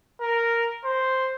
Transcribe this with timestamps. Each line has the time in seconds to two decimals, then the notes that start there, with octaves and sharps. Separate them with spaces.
0.21 A#4
0.85 C5